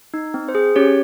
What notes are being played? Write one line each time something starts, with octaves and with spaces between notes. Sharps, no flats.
D#4
C4
C5
G#4
C#4 G4 C#5